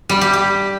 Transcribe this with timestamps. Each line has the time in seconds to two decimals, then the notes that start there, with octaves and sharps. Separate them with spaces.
0.09 G3
0.21 G4
0.33 G4